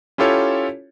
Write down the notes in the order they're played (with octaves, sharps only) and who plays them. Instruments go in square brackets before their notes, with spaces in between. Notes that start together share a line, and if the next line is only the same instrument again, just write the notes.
[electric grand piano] C#4 E4 F4 G4 A4 C#5